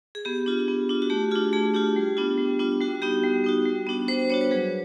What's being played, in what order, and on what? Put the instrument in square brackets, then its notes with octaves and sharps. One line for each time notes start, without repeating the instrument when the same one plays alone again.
[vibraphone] G#4
B3 G4
D4 F4
B3
D4 F4
F#4
A3 G4
D4 F4 G#4
A3 G#4
D4 F4 G4
G3
B3 D4 F4
G3
B3 D4 F4
G3 F#4
B3 D#4 F#4 G4
G3
B3 D#4 F#4
G3
B3 D4 F#4
G3 C5
C5
B3 D4 F#4 C#5
B4
F#3 G#4